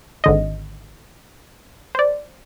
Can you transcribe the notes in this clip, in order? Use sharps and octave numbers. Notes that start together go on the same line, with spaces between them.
G#1 D3 D#5
C5 D5